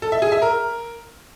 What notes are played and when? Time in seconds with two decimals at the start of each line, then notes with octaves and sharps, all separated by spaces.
0.02 A4
0.12 E5
0.22 G#4
0.32 E5
0.42 A#4